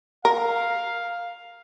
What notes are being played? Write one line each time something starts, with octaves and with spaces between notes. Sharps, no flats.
A#4 F5